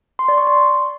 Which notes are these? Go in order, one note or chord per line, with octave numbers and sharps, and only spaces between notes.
C6
D5
C#6
C6